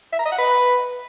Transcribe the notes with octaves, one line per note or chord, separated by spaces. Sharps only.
E5
A#5
D#5
F#5
B4